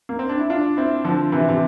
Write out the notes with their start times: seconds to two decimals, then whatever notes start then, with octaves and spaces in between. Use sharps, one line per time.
0.09 A#3
0.19 C4
0.29 D4
0.39 E4
0.50 D4 F4
0.77 C4 E4
1.05 D3 F3
1.32 C3 E3
1.49 C3